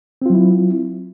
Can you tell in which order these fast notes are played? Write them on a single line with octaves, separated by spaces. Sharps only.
C4 F4 F#3 E4